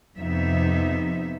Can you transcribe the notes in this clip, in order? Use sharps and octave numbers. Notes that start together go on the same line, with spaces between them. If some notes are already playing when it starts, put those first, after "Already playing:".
F2 C3 B3 D#4 E5